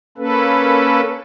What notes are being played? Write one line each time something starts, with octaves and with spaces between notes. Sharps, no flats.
A#3 C#4 A4 B4